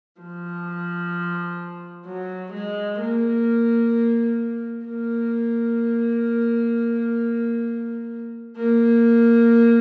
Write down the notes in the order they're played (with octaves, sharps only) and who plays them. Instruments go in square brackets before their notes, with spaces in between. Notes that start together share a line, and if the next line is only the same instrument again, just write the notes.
[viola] F3
F#3
G#3
A#3
A#3
A#3